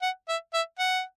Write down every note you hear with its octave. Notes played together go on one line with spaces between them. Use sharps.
F#5
E5
E5
F#5